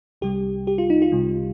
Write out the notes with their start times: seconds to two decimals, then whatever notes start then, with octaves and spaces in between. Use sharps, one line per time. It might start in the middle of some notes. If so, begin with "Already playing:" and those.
0.21 C2 C3 G3 G4
0.67 G4
0.78 F4
0.90 D#4
1.02 F4
1.12 C2 C3 G3